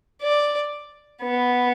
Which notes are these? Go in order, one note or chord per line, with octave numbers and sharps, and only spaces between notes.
D5
B3